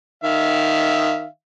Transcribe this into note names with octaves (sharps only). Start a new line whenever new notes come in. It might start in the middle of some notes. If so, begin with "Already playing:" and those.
D#3 E5 F5